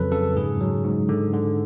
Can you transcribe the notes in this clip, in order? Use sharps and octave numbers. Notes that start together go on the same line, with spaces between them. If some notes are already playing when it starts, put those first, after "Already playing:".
Already playing: F2 C#3 F#3 A4 B4
C#3 A4
G#2 G#4
F#3
G#2
D3
D3